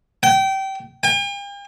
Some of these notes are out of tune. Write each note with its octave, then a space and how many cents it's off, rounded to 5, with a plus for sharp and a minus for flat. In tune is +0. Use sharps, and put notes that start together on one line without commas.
G5 -25
G5 +45